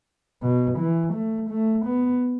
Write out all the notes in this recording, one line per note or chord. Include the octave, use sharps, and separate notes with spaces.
B2
E3
A3
A3
B3